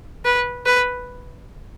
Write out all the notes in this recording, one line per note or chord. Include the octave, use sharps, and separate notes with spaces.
B4
B4